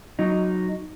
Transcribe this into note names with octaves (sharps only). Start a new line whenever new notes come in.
F#3 D#4